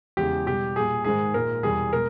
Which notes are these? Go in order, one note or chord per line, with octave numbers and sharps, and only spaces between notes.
E2 C#3 G#3 G4
B2 G3 G4
A#2 G3 G#4
G#2 D#3 G#3 G#4
A#2 G#3 A#4
E2 B2 G3 G#4
B2 G#3 A#4